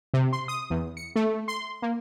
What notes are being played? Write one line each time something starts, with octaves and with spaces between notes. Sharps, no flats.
C3
C6
D#6
E2
C#7
A3
C6
A#3